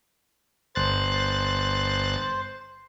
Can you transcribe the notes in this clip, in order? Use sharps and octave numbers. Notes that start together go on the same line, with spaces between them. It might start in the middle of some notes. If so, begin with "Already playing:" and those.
G1 C5 F#6 A6